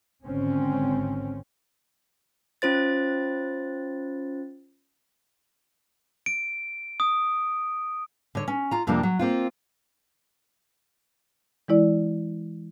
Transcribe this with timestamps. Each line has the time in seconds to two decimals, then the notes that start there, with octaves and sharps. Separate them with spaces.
0.23 G#1 D3 C4 C#4
2.62 C#4 F4 C5 A6
6.26 D7
7.00 D#6
8.35 D3 C#5
8.48 C#4
8.71 F4 A#5
8.87 F2 C3 F3 A#3 D4
9.03 F#3
9.19 A#3 C4 F4
11.68 E3 G#3 E4 D5